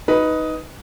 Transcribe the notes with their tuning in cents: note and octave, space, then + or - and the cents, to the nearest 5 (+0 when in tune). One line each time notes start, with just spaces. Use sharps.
D#4 +10 B4 +0